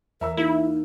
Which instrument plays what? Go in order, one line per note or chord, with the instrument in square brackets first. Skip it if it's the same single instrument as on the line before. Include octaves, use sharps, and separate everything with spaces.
[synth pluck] E2 [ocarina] A#4 [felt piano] E5 A#5 E6
[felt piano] A#3 [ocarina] D#4 [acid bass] E4